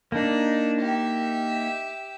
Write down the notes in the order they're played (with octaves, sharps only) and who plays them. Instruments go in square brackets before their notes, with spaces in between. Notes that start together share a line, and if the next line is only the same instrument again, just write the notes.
[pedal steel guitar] A#3 D#4 [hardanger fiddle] D4
[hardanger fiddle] G4 E5